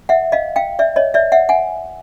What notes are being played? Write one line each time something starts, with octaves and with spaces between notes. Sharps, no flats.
E5 F#5
D#5 F5
F5 G5
D5 E5
C#5 D#5
D5 E5
E5 F#5
F#5 G#5